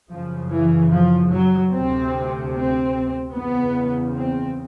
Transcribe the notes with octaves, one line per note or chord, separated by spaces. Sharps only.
F#2 C#3 F3
E3
F3
F#3
D2 C3 C4
C4
E2 C#3 B3
C4